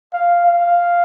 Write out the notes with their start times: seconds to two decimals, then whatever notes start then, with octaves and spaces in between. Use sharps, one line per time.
0.13 F5
0.46 F5